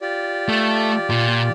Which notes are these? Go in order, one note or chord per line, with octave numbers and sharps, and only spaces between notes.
F4 G4 D5
A3
A#2